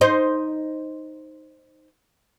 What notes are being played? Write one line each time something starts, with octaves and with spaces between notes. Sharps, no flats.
D#4 C5